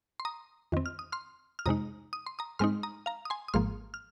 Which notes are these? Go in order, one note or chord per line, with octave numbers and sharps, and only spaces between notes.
C6
A#5 D#6
F2 D#3 C4
F6
D#6
C6 F6
F6
F2 C3 G#3 D#4 A#5 D#6
D#6
C6
A#5 D#6
G#2 G#3 C4 D#4 C6 F6
A#5 D#6
F5 A#5
D#6
G#5 C6
D#6
G#1 G#2 F3 A#3 C6 F6
F6